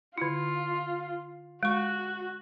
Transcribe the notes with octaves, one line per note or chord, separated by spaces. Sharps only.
D3 E4 F4
G#3 F#4 C#6